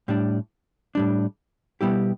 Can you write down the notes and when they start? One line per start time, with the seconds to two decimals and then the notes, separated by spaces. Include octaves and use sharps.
0.08 A2 G3 D4
0.95 A2 G3 D4
1.81 B2 G3 B3 E4 G4